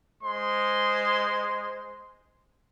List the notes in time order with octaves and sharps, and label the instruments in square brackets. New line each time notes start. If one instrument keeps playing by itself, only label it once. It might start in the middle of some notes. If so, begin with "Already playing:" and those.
[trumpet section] G#3 C5 C6